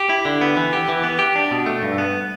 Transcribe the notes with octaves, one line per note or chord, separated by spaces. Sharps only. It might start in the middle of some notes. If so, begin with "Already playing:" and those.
Already playing: G4
E4
D3
B3
E3
G4
E3
B3
G4
D4
B2
A3
G2
B3